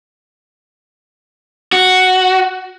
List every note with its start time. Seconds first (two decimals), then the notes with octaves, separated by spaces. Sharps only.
1.73 F#4